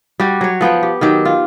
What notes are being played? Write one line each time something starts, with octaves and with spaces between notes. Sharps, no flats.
G3 F#4 G4
F#3 C#5
F3 B3 F#5 G5
G4
D#3 F#3 G4
F4